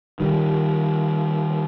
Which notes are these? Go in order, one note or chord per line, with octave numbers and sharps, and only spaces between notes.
D#3 G3